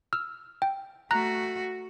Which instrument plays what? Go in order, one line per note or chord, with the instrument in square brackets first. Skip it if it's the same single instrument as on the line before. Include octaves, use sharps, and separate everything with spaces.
[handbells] E6 F6
G5
[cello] A3 F#4 [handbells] A#5 F#6 A#6